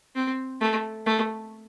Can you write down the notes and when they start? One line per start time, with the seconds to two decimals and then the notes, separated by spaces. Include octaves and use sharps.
0.15 C4
0.61 A3
1.06 A3